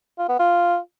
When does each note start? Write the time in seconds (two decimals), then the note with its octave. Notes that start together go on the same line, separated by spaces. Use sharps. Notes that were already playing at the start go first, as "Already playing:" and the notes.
0.18 F4
0.29 B3
0.39 F4